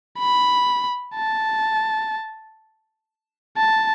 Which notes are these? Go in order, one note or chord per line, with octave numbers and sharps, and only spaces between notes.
B5
A5
A5